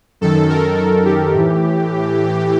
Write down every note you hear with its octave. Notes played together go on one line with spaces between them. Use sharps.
F#2 D#3 A4
A#4
A4
G4
A2 E3